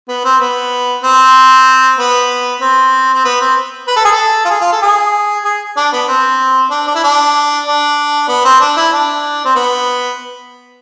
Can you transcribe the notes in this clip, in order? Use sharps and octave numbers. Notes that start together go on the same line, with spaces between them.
B3
C4
B3
C4
B3
C4
C4
B3
C4
B4
A4
G#4
A4
F4
G#4
F4
A4
G#4
G#4
D4
B3
C4
D4
D4
E4
D4
D4
B3
C4
D4
E4
D4
C4
B3